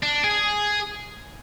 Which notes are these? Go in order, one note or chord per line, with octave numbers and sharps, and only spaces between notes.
D4
G#4